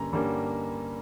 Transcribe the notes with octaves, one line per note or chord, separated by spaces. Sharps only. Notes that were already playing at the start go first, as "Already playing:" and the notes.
Already playing: G2 D3 G3 A#3 C#4 A#5
G2 D3 G3 A#3 C#4